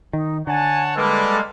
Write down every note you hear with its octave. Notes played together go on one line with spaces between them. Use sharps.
D#3 D#4
D3 C#5 F#5 G#5 A5
G3 G#3 A#3 A4 B4 D5